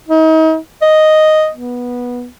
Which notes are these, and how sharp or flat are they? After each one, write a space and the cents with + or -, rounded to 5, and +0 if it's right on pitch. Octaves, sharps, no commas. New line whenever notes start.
D#4 +40
D#5 +0
B3 -15